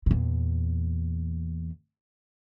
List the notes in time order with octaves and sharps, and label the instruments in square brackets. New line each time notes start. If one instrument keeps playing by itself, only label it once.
[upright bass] E2 A#2